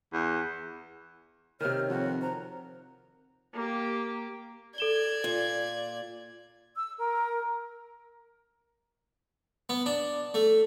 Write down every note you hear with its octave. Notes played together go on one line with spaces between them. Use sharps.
E2
C3 D#3 C#5 F6
F2 F#4
C5 A#5
A#3 G4
A4 D5 G#6 E7 G7
A#2
E6
A#4
B3
D4
A3